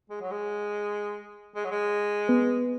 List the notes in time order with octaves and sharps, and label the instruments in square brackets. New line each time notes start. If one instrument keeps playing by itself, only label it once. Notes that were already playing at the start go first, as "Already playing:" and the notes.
[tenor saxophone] G#3
F#3
G#3
G#3
F#3
G#3
[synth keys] B3 B4